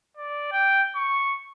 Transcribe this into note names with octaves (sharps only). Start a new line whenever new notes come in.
D5
G5
C#6